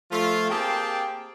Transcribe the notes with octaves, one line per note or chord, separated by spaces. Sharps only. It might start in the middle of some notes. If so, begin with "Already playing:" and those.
F3 A3 F4
A#3 C4 G4 G#4 G5 A5